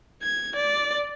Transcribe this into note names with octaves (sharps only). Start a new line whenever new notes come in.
G#6
D5